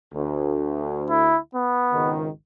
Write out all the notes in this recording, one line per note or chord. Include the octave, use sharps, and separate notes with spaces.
D2
E4
B3
G#1 C#2 D#3